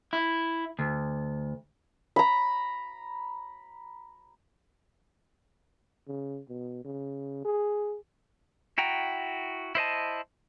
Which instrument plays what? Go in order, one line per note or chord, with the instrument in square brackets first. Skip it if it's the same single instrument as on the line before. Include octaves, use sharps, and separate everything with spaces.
[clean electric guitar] E4
D2
[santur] A#5 B5
[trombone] C#3
B2
C#3
G#4
[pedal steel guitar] E4 F#4 G5 A#5
E4 C5 D#5 A5